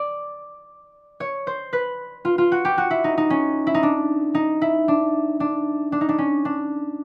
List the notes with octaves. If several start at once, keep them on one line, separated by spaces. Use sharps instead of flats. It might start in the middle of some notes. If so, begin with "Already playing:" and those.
Already playing: D5
C#5
C5
B4
F4
F4
F#4
G4
F#4
E4
D#4
D#4
C#4
E4
D#4
D4
D#4
E4
D4
D4
D4
D#4
D4
C#4
D4